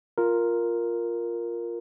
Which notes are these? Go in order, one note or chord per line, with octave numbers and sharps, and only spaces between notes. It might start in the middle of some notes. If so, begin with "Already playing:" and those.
F4 A#4